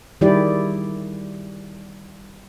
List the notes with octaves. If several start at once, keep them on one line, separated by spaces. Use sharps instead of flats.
D#3 G3 E4 G4 G#4 D5